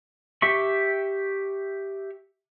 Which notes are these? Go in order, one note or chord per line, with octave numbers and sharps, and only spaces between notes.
G4 E5 C#6